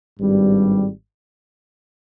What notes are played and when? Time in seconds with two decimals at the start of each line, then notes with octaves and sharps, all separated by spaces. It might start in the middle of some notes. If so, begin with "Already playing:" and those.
0.20 G#1 G2 G3